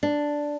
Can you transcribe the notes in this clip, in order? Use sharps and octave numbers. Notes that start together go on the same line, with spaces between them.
D4